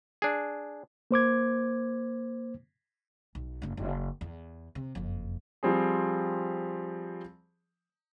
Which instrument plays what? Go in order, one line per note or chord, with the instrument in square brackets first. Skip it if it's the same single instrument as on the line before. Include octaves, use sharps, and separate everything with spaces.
[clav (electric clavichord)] D4 G#4
[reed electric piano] A#3 C5 D6 G#6
[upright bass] B1
F#1 G2
F#1
E2
C3
F#1 F2
[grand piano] F3 G3 C4 G#4